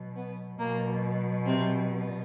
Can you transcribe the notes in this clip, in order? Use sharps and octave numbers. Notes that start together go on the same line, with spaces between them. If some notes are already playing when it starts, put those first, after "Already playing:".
Already playing: B2 F#3
B3
B2 F#3 A#3
C3 C4
B3